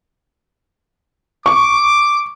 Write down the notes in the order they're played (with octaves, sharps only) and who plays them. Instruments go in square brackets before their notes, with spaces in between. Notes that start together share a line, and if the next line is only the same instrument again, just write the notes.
[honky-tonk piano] C#6 [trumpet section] D6